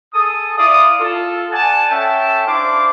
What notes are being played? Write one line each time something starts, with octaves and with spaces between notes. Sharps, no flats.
G#4 A4 D#6
E4 D5 F5 D#6
F4 A4
D5 F#5 G#5 A5
C#4 A4 E5 G5 A5
D4 E4 C5 F5 D6